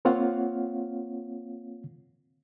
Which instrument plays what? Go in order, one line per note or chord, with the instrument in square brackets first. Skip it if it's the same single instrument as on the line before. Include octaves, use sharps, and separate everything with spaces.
[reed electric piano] A#3 C4 F4 C#5 F5 F#5